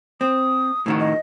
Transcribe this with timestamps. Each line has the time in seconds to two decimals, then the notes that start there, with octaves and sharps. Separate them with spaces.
0.21 C4 D#6
0.86 A2 D#3 F#4
1.00 D#5